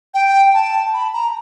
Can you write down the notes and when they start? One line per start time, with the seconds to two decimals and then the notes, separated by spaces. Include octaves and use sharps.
0.14 G5
0.54 A5
0.94 B5
1.13 A#5